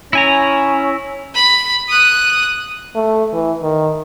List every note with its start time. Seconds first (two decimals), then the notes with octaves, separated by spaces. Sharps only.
0.13 C#4 E4 G#5 A#5
1.35 B5
1.88 D#6 F#6
2.96 A3
3.33 E3
3.62 D#3